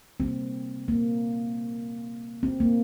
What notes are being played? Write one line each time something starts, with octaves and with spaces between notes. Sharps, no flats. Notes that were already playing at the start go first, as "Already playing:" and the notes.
C3 G3 A#3 C4
A#3
C4
A#3